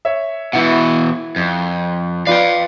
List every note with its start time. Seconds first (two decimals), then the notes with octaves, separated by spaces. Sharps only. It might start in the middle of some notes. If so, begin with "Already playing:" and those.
0.05 C#5 E5
0.53 B2 E3 E4 F#5
1.36 F2
2.27 F4 B4 D5 F5 G5